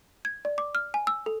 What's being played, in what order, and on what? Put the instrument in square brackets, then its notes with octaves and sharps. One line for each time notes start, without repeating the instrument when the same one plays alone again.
[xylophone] G#6
D5
D6
F6
G#5
E6
A4